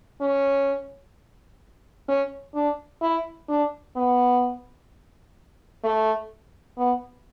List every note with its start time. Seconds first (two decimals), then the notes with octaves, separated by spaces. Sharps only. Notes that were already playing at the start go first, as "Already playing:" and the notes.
0.21 C#4
2.09 C#4
2.55 D4
3.02 E4
3.49 D4
3.96 B3
5.84 A3
6.78 B3